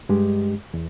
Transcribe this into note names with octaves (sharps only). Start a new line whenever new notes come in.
G2 G#3 G4
E2